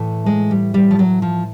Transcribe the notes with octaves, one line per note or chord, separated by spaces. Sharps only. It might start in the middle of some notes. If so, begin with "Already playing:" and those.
Already playing: A2 E3 A3
G#3
G3
G3
F3
F#3
F3